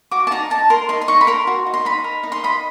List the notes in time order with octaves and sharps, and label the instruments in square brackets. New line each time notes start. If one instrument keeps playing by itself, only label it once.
[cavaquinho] F#4 D6
A5
D#4 A#5
D#4 A5
A#4 C6
D#4 C6
C6
D#4 C#6
B5
A#4 C6
F#4
D#4
C6
D#4 B5
A#4
D#4
C6
D#5 B5